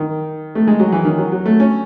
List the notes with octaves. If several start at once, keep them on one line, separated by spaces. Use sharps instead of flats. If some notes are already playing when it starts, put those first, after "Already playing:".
Already playing: D#3
A3
G#3
F#3
E3
D#3
F#3
F#3
A3
C#4